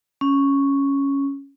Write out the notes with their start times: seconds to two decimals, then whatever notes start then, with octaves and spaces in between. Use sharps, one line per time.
0.21 C#4